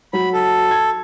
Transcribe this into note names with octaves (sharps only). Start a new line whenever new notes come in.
F#3 B5
A4
G#6